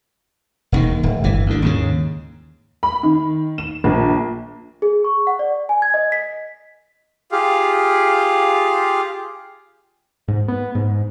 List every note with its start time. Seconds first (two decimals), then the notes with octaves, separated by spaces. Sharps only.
0.72 E1 D#2 D#3
1.03 D1
1.24 G1 E3
1.46 D2 D3
1.62 D#2 G#2 C#3
2.83 B5
3.03 D#3
3.58 E7
3.84 A#1
4.82 G#4
5.04 C#6
5.27 F#5
5.39 D5
5.69 G#5
5.82 G#6
5.94 D#5
6.12 B6
7.32 F4 G4 G#4 F5
10.28 G#2
10.48 B3
10.75 G#2